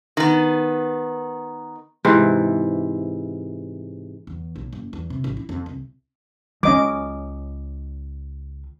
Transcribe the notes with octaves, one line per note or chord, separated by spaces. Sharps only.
D#3 B3
G#2 C3 E3
E2
B1
F#1
E2
C3
A1
E4
F2
C2
C#2 C#4 D#5 D6